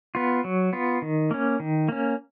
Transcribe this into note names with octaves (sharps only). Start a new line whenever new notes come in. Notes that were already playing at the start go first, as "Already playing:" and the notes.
B3 F4
F#3
B3 F4
D#3
A#3 C#4
D#3
A#3 C#4